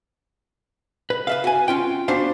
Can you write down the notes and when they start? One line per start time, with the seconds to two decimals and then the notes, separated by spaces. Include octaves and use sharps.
1.10 B4
1.27 B4 E5 F5
1.44 F#4 G#5
1.68 C#4 F4 G5
2.08 B3 D4 F#4 C5 F5